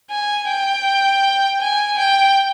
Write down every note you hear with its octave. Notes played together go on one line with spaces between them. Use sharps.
G#5
G5
G#5
G5